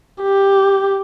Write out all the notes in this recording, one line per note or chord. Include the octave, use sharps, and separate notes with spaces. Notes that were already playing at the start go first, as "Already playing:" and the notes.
G4